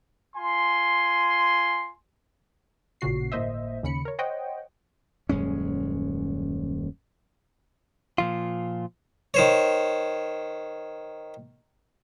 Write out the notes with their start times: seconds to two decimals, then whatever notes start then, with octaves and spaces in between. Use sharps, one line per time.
0.35 F4 G#5 C6
3.01 A1 A#2 C#3 F#4 C7
3.32 G1 A2 A#3 C5 D#5 E5
3.83 D#2 C#3 B5 C#7
4.05 A#4 C#5
4.19 C5 C#5 D#5 F#5 G5
5.29 D#1 F#2 G#3 C#4
8.18 A#2 F3 F4
9.34 D#3 C5 C#5